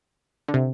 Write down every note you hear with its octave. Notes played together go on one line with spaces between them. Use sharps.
D3
C3